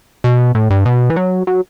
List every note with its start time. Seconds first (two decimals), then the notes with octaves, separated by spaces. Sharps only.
0.24 B2
0.55 A2
0.70 G2
0.85 B2
1.10 E3
1.16 F#3
1.47 F#3